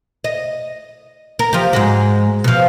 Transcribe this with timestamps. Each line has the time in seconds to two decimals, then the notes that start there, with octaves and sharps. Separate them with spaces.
0.24 D#5
1.39 A#4
1.53 F3 G4
1.73 G#2 G#3 F#4
2.44 B2 F3